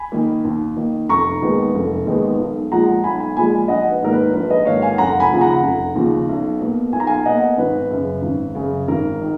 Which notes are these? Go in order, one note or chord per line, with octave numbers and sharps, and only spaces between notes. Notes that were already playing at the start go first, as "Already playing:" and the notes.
Already playing: G#5 B5
D#3 A#3
D#2
D#3 A#3
F1 A#5 C#6
D#2 D#3 G#3 B3
F1
D#2 D#3 G#3 B3
B1
A#2 F3 G#3 F#5 A#5
B1 G#5 B5
G#5 B5
A#2 F3 G#3 G#5 B5
A#1 D#5 F#5
B4
G#2 D#3 A#3 A#4
B4
A#1 B4
B4 D#5
G#2 D#3 A#3 C#5 F5
F5 G#5
F1 F#5 A#5
G#5 B5
D#2 C#3 F3
F#5 A#5
F1
D#2 C#3 F3
B1
B2 A#3
B1 G#5
A#5
F5 G#5
B2 A#3 D#5 F#5
G#1 B4
F#2 C#3
G#1
F#2 C#3
G#1 A#4
D#3